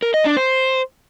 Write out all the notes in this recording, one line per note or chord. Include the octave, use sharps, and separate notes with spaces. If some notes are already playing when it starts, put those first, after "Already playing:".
A#4
D#5
D4
C5